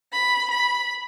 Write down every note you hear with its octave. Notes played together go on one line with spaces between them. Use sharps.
B5
B5